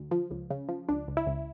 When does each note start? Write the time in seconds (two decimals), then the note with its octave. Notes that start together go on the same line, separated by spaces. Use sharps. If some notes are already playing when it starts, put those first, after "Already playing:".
Already playing: D2
0.11 F3
0.31 C#2
0.50 C#3
0.69 F3
0.89 C#2 D4
1.08 C#2
1.17 E4
1.27 C#2